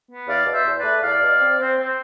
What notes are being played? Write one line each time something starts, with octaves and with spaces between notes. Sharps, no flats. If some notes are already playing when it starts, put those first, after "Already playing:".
B3
E2 D5 F5
B2
C5 E5
E2
B4 D5
A3
E2 D5 F5
B2
C4
C4
C4